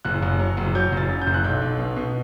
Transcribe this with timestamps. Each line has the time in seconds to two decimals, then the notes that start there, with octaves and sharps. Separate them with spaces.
0.05 F#1 F#6
0.22 F#1
0.39 F#3
0.57 F#1
0.75 F#3 G6
0.92 F#1 A6
1.10 F#2
1.21 G6
1.27 F#1
1.34 F#6
1.44 B1 G6
1.62 B1
1.79 B2
1.96 B2